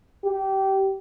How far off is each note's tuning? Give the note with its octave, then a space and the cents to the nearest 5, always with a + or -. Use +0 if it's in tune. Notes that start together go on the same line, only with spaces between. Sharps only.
G4 -20